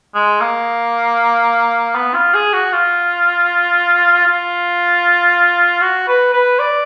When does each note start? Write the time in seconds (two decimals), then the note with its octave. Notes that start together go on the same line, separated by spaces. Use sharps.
0.15 G#3
0.41 A#3
1.95 B3
2.14 F4
2.34 G#4
2.53 F#4
2.72 F4
4.27 F4
5.81 F#4
6.08 B4
6.33 B4
6.59 D5